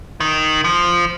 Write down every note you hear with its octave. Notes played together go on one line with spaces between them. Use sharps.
D#3
F3